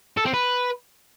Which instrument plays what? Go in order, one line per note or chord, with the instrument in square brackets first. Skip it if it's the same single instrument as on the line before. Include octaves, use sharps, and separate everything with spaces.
[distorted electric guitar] A4
C4
B4